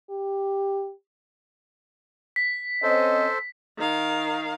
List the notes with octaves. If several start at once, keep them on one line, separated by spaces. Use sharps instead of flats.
G4
B6
C4 C#4 A4 C5 D#5
D#3 F5